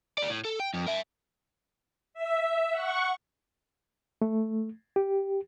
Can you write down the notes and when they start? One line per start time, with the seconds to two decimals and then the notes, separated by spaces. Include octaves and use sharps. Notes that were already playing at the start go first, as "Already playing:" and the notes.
0.18 A3 D5
0.29 A2
0.45 A4
0.60 G5
0.74 F2
0.87 A#4 E5
2.14 E5
2.71 F#5 C#6
4.22 A3
4.96 G4